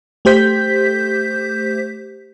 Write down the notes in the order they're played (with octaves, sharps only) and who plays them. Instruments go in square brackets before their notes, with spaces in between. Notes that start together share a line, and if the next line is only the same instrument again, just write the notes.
[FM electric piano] A3 G4 C5 G6 B6